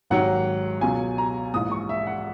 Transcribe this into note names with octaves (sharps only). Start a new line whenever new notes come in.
G#1 G#2 D#3 F#3 F#5
C#2 B2 F#3 G#5
A#5
A#1 G#2 E3 D#6
C#6
E5
F#5